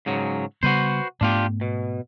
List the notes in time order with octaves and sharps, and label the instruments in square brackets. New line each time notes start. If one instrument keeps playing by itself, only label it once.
[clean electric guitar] G#2 C#3 F#3
[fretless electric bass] C#3 G3 B3 [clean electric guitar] F#4 B4 C5
[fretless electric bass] G#2 A3 B3 [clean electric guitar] D4 F4 G4
[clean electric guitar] B2